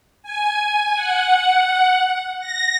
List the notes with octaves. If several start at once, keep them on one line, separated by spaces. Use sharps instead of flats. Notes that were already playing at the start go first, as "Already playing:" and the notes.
G#5
F#5
A#6